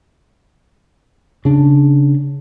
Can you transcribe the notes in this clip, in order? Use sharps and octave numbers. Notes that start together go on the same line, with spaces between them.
C#3 D4